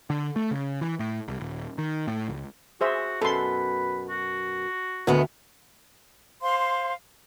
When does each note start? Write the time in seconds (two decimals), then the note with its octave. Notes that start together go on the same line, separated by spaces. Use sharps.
0.10 D3
0.36 A3
0.51 C#3
0.81 E3
0.99 A2
1.28 C2
1.40 D#1
1.78 D#3
2.07 A2
2.28 C#2
2.81 F#4 G#4 C5 E5
3.21 F#2 B2 A4 B4 C6
4.09 F#4
5.07 D2 D#3 A3 B3
6.41 C5 F5 C6